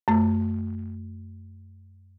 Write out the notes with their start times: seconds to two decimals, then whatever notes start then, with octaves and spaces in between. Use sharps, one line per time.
0.08 F#2 A3